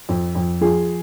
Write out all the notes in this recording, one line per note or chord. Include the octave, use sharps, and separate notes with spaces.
F2
F2
F3 G#4